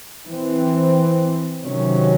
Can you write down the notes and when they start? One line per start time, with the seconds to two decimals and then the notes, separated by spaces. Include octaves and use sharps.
0.30 E3 C4
1.63 C3 D#3 F#3 C#4